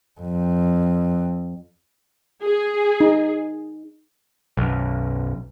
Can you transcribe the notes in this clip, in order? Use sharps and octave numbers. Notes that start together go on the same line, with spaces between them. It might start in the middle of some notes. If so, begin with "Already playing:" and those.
F2
G#4
D#4
B1 F#2